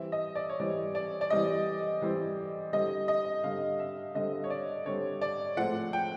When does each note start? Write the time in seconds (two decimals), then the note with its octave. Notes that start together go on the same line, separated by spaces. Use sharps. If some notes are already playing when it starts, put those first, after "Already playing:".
Already playing: E3 G3 C4 E5
0.12 D#5
0.35 D5
0.49 C#5
0.60 E3 G3 C4 D5
0.95 D5
1.21 D5
1.30 E3 G3 C4 D#5
2.02 E3 G3 C4
2.73 D3 G3 C4 D#5
3.08 D#5
3.44 D3 G3 C4 F5
3.79 E5
4.15 D3 G3 C4 D#5
4.44 C#5
4.50 D5
4.86 D3 G3 C4 C#5
5.22 D5
5.57 A2 F3 G#3 C4 F#5
5.93 G5